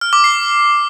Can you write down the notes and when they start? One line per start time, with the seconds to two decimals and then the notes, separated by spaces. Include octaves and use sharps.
0.01 F6
0.13 D6
0.24 C7